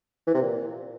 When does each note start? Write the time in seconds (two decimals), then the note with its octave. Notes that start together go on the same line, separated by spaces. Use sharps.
0.27 E3
0.34 C3
0.42 A#2